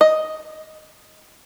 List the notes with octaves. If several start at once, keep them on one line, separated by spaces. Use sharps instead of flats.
D#5